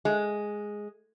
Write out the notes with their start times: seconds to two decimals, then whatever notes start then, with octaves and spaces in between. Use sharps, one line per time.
0.05 G#3